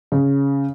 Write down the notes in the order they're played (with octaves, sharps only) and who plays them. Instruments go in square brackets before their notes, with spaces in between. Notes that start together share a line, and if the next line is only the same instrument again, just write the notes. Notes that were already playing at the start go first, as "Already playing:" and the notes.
[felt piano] C#3